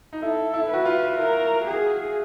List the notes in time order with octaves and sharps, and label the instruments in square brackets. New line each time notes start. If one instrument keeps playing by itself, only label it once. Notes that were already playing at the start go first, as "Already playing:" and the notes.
[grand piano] D#4
[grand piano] E4 [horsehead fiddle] A4
[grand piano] E4
[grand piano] F#4 [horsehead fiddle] B4
[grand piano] F4
[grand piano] E4 [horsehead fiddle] A#4
[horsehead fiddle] G#4